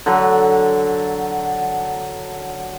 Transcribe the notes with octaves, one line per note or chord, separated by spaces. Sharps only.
D3 F#3